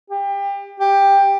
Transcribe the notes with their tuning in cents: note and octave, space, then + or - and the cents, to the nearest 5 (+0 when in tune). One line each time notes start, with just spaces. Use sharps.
G4 +25
G4 +10